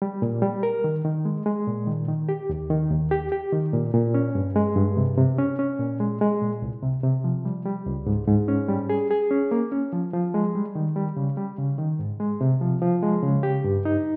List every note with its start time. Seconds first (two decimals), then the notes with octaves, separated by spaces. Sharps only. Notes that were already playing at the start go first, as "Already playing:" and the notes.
0.02 G3
0.22 A#2
0.42 G3
0.63 A#4
0.84 D#3
1.05 D#3
1.25 G#3
1.46 G#3
1.67 A#2
1.87 D#3
2.08 D#3
2.29 G4
2.49 D#2
2.70 D#3
2.90 D#2
3.11 G4
3.32 G4
3.52 D#3
3.73 A#2
3.94 A#2
4.14 C#4
4.35 G2
4.56 G#3
4.76 G2
4.97 C3
5.18 C3
5.38 C#4
5.59 C#4
5.79 A#2
6.00 G#3
6.21 G#3
6.42 A#2
6.62 C2
6.83 C3
7.03 C3
7.24 F3
7.45 G3
7.66 G3
7.86 C#2
8.06 G#2
8.28 G#2
8.48 C#4
8.69 G3
8.89 G#4
9.11 G#4
9.31 C#4
9.51 A#3
9.72 C#4
9.93 F3
10.13 F3
10.34 G#3
10.55 G3
10.75 D#3
10.96 G3
11.17 C#3
11.37 G3
11.58 C#3
11.78 D#3
11.99 G#2
12.20 G#3
12.41 C3
12.61 F3
12.82 F3
13.03 G#3
13.23 C#3
13.43 G4
13.64 G2
13.85 D#4